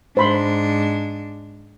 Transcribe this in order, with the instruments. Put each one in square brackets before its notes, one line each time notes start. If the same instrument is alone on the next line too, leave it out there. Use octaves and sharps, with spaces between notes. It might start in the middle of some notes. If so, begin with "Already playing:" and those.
[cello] G#2 D4 [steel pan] C5 B5 C6